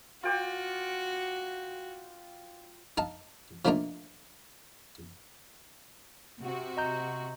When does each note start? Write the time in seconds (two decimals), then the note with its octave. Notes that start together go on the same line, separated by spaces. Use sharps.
0.23 F4 F#4 G5 D6
2.98 D#4 F5 A5
3.65 F3 A3 A#3 D4 D#4 F4
6.42 C3 F#4
6.77 D#5 A#5 G6